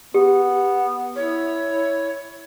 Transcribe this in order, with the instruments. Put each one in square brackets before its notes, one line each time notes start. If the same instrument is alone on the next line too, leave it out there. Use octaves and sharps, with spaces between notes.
[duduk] B3 [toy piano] G4
[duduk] E4 [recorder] C#5